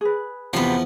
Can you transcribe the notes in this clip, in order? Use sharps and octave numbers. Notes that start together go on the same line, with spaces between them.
G#4 B4
E2 C3 F3 B3